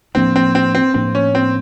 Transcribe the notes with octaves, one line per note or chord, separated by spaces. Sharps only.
A2 F3 A#3 C4 D4
C4
C4
C4
A2 F3 A#3 C4 D4
C#4
C4